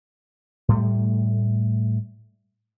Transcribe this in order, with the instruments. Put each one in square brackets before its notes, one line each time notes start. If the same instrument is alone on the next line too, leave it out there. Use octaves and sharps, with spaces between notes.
[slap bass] A2 G3 A3